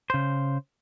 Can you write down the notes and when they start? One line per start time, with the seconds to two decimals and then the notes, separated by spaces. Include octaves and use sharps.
0.10 C#3 C5